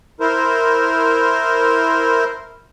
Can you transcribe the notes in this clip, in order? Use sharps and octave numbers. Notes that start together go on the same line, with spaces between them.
E4 A#4 C5